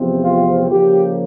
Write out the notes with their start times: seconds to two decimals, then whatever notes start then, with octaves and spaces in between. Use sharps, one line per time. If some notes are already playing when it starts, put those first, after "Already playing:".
Already playing: E2 C3 F3 A3 C4
0.23 F4
0.70 C#3 F3 A#3 G4